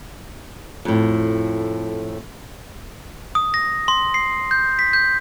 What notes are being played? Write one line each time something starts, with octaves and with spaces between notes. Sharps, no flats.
F2 A2
D#6
A#6
C6
C7
G6
B6
G6